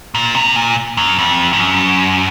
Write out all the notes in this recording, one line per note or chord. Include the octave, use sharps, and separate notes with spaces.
A#2
C3
A#2
F#2
F2
G#2
F#2